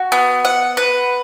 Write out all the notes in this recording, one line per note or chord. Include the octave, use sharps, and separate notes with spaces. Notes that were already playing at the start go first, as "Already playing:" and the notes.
Already playing: F#4
B3
F#5
B4